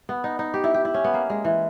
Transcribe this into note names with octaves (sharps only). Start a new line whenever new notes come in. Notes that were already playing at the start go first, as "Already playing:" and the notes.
B3
D#4
D#4
G4
E4
G4
E4
C#4
B3
A#3
G#3
E3